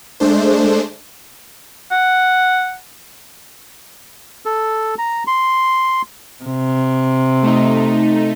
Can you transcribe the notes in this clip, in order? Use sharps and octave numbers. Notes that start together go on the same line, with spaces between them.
G#3 A3 D4 C5
F#5
A4
A#5
C6
C3
A3 D#4